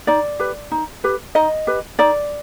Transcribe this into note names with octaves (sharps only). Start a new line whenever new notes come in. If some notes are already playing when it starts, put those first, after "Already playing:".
D#4 D5
G4 B4
D#4
G4 B4
D#4 D#5
G4 B4
D#4 D5